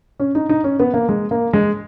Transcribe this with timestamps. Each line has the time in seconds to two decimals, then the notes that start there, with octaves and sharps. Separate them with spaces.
0.20 C#4
0.35 D#4
0.49 D#4
0.64 C#4
0.80 B3
0.94 A#3
1.09 G#3
1.31 A#3
1.53 G#3